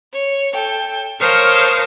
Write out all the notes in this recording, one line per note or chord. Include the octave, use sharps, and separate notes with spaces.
C#5
A4 G5
A#4 C5 C#5 F5 A5 D#6